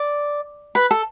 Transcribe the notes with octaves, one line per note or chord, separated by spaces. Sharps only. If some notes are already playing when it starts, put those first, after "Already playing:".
Already playing: D5
B4
A4